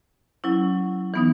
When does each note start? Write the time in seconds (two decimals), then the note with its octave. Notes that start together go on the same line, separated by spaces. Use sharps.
0.44 F#3 C#4 E4
1.14 E3 B3 D#4